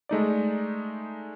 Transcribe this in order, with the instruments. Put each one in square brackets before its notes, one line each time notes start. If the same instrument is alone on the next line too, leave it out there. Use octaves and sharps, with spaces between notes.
[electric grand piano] G#3 A3 D#4 D5